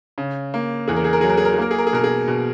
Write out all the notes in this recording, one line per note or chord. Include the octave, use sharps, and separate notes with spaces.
C#3
A#3
E2 G#4
A#4
G#4
A#4
F#3 G#4
A#4
G#4
A#4
G#4
A#3 A#4
G#4
A#4
G#4
B2 A#4
G#4
B2